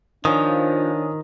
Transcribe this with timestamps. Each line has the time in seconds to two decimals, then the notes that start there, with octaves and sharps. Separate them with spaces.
0.25 D#3 F3 D4 C#5 G#5 D#6